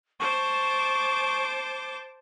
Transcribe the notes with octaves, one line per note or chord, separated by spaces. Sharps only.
C5 A5 C#6 D6